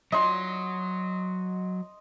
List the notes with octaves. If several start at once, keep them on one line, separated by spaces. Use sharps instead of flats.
F#3 C#5 D#5 C6